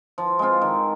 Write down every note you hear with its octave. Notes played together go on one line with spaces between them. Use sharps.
F3
G#3 C4 F4
D#3